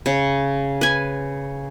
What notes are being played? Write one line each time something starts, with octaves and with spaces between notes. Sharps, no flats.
C#3
B4 G#5